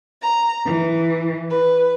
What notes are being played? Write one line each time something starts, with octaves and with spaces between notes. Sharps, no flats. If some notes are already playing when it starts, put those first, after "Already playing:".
A#5
E3
B4